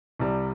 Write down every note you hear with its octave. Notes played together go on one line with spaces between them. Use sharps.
C2 C3 G3